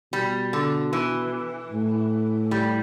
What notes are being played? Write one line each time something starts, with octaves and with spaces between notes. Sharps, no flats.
B2 G3
D3
E3
A2
G3